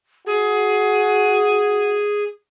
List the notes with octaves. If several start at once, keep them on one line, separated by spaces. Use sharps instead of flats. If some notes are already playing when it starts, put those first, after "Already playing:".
F#4 G#4